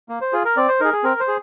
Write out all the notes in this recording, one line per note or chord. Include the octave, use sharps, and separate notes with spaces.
A#3
C5
F4 G#4
A#4
C4 D5
C5
D#4 G#4 A#4
G#4
C4 A#4
C5
G#4